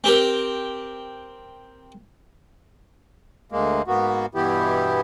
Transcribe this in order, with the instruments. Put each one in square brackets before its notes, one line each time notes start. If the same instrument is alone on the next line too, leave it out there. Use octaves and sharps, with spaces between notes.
[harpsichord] C4 G4 A#4
[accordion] D2 G#3 A#3
G#2 A#3 B3 F#4
G2 B2 E3 B3 E4 G4